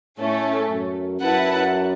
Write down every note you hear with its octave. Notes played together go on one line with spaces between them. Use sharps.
A2 A3 C#4 A4
F#2
F#2 E4 B4 F#5 A5